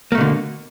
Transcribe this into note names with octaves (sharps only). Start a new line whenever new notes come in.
B2 D3 A3 A#3